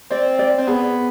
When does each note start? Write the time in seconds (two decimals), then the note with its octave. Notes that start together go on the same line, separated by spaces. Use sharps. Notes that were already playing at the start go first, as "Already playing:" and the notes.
0.10 C4 D5
0.39 D5
0.58 C4
0.67 B3 G#4